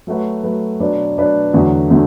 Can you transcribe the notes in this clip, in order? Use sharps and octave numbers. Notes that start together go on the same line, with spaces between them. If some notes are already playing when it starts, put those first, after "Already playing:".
F#3 A3 F#4 B4
F#3 A3 F#4 B4
B2 F#3 D4 B4 D5
B2 F#3 D4 B4 D5
E2 D3 F#3 A3 F#4
D3 F#3 A3 F#4